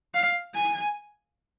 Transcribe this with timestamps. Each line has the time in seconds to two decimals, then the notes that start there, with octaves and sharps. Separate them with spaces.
0.14 F5
0.55 G#5